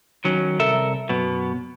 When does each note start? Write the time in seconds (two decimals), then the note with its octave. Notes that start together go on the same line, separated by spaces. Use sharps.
0.25 D#3 F#3 C#4
0.60 C2 A4 A#4 E5
1.09 F#2 B2 B3